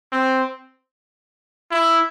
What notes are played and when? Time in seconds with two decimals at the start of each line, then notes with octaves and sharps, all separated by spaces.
0.12 C4
1.71 E4